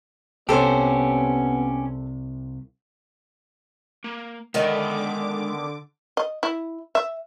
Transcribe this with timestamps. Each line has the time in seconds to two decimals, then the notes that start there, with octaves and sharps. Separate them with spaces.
0.49 C2 C3 B3 C#4 G4 A4 C5
4.04 A#3
4.54 D3 D#3 G#3 B3 A#4 D#5 E5 D6
6.17 D#5
6.43 E4
6.95 E5